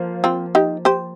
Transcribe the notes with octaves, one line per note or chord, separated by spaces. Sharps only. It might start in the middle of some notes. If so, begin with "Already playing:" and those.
Already playing: F3 A#3
C4 F4
D#4 G4
G4 C5